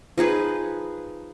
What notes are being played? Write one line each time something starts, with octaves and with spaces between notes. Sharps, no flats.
F3 D#4 G#4 B4